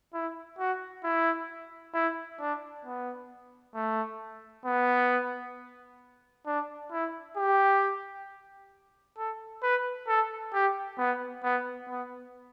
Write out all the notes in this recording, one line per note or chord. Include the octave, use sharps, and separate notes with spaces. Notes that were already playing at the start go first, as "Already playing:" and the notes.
E4
F#4
E4
E4
D4
B3
A3
B3
D4
E4
G4
A4
B4
A4
G4
B3
B3
B3